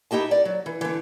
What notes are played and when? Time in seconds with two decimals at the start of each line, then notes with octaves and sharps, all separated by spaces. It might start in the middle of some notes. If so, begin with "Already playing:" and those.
0.11 D#4 E4 G4 D#5 A5
0.31 D5
0.45 F#3
0.66 E3
0.81 D3 E3